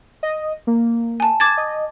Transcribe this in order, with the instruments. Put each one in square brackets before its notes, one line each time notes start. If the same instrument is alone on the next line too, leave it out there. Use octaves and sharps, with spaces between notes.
[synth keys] D#5
A#3
[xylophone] G#5 A5
[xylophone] D6 G#6 A6 [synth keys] E7
[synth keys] D#5